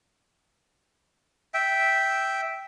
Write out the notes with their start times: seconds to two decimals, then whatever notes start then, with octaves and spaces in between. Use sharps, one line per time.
1.54 E5 G5